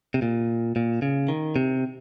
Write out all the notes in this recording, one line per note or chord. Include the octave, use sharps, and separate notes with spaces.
C3
A#2
A#2
C#3
D#3
C3